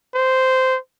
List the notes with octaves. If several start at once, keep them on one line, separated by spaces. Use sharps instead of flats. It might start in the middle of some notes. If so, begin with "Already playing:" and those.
C5